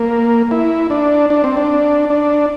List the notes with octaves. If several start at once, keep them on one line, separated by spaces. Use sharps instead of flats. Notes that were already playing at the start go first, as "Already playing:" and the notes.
Already playing: A#3
E4
D4
D4
C4
D4
D4